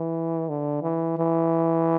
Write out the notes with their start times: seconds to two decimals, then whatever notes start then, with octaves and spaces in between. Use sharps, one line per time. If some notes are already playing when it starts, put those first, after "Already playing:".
Already playing: E3
0.49 D3
0.82 E3
1.18 E3